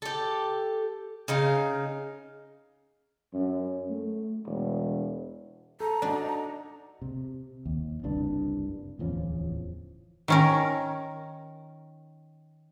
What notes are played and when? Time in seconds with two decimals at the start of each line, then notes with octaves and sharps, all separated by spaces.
0.02 G4 A4
1.28 C#3 D#4 F5
3.34 F#2
3.90 A3
4.47 E1
5.81 A4 A#5
6.02 D4 D#4 F#4 D5
7.02 C3
7.66 D#2
8.03 F#1 C2 G2 D4
8.99 D1 E2 F3 C#4
10.28 D#3 C#4 A#4